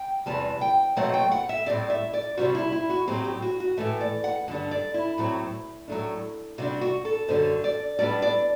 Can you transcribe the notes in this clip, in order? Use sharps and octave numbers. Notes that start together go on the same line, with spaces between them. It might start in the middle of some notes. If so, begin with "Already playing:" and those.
Already playing: G5
E2 C3 E3 G3 A5
G5
B2 F#3 A3 C4 F#5
G5
F#5
E5
A2 G3 C4 D5
E5
D5
C3 G3 C4 F#4
E4
E4
F#4
A2 F#3 C4 G4
G4
F#4
F#4
A2 E3 A3 E5
D5
F#5
G2 D3 G3 D4 F#5
D5
E4
A2 F#3 C4
A2 F#3 A3 D4
C3 G3 D4 F#4
F#4
A4
F#2 D3 G3 C5
D5
A2 G3 B3 D4 D5
D5